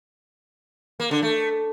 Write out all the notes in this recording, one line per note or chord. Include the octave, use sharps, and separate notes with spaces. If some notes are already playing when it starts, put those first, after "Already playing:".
A#3
D3
A3